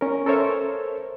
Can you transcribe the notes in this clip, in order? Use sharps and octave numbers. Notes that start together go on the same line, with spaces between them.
C#4 A#4
A4 A#4 C5 C#5 E5